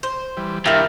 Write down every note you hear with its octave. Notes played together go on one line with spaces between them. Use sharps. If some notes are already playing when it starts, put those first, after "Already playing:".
C5
E3 G3
G2 D#3 A#3 E4 F4 G4 E5